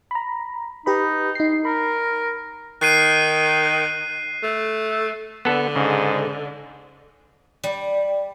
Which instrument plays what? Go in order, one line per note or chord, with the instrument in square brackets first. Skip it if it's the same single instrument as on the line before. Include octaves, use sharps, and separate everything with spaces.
[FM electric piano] A#5 B5
[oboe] D#4 [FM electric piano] G4 B4 B5
[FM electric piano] D#4 C7
[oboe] A#4 [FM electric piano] B5
[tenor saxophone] D#3 [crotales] F#6 C7 D#7
[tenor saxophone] A3
[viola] D3 [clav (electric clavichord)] B3 A4
[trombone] G#2 [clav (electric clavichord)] C#3
[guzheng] G3